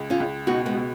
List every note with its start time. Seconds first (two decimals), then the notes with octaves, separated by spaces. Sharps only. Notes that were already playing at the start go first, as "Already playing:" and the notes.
Already playing: C#2
0.10 C#4 F4
0.20 C#2
0.47 B2 D#4 F#4
0.66 G#3 B3
0.75 B2